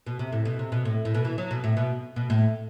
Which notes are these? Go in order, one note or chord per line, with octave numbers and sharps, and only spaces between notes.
B2
C3
A2
B2
C3
B2
A2
A2
B2
E3
F#3
B2
A2
B2
B2
A2